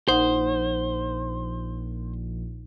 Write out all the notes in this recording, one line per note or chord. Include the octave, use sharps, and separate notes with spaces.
A#1 D#4 C5 F#5